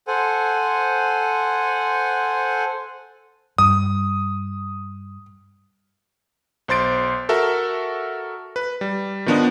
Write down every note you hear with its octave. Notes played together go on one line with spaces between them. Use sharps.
A4 C5 F#5 G#5
G2 D#6
B1 C5 C6 A6 D7
F#4 A4 A#4 E5
B4
G3
D#3 F3 B3 D4 D5 D#5